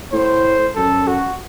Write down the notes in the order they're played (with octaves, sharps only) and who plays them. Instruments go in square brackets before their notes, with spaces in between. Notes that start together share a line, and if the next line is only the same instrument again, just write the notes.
[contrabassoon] A2 [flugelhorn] C5
[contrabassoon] F#2 [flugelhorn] A4
[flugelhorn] F#4